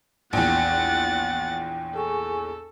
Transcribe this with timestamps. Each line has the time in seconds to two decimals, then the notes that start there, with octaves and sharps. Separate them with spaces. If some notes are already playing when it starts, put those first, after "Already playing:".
0.33 A#1 E2 F#5 G5 A6
1.96 G#4 A4 G#5 C#6